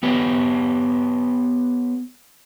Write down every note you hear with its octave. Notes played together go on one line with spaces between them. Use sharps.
B3 G4 B4 C#5